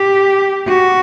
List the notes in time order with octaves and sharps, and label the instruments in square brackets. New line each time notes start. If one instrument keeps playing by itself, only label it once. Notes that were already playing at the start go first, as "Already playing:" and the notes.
Already playing: [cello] G4
F#4